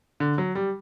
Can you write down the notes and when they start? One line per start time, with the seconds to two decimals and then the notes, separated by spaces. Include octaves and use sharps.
0.20 D3
0.38 F#3
0.55 G3